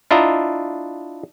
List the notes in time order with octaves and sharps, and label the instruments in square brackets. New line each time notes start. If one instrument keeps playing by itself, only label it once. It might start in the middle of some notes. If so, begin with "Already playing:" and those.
[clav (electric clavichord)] D4 E4 F4 D#5 E5 A#5